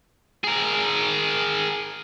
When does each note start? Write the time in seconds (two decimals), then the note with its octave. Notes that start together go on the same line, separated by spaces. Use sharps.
0.44 G#4 A#4